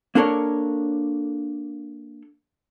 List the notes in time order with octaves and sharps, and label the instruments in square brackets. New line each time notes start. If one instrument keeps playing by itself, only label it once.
[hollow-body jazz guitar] A#3 D4 A4 A#4 C#5